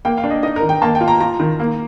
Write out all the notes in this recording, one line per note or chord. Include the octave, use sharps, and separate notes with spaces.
A#3 G5
F5
D4
D#5
D#4 D#5
A#4
D#3
G5
A#3 A5
G5
F4
A#5
F4 A#5
D#3
A#3